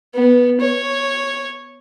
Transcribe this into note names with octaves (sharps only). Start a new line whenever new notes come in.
B3
C#5